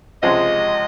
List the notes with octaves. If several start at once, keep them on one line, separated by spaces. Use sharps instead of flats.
C#2 C3 F3 G#3 D#5